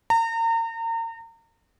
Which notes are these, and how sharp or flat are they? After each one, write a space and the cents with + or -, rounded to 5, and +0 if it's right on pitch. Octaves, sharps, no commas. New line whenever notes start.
A#5 -35